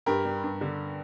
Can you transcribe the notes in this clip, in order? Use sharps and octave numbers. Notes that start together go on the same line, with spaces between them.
G2 G4 A#4
G3
G2
D3